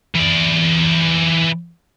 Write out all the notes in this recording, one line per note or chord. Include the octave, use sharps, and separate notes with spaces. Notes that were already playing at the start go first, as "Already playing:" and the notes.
E3 D5